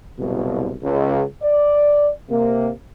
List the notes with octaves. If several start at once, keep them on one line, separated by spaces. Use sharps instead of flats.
F#1 C2 B2
C#2
D5
C3 A#3